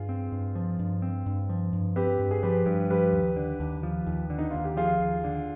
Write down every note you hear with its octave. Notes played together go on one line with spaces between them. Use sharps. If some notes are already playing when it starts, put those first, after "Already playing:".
Already playing: G2 F4 G#4
C4
G2
F3
G2
C4
G2
F3
G2
C4 G4 B4
G2
G#4
F3 G4 B4
G2
F3 G4 B4
D#2
D3
D#2
F3
D#2
D3
D#4
D#2 F4
G4
F3 F4 G#4
D#2
D3